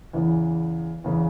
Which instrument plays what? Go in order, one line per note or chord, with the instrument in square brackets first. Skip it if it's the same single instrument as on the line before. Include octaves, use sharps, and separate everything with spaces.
[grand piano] E2 C#3 E3
E2 C#3 E3